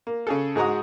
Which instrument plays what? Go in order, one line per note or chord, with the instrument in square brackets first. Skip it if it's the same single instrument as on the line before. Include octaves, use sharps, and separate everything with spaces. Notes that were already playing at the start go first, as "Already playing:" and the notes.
[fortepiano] A#3
C#3 G#4 A4
G#2 G#3 F#4 A#5 D#6